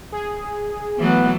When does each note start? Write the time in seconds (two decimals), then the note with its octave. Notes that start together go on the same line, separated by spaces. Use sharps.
0.12 G#4
0.99 E3 F#3 A3 B3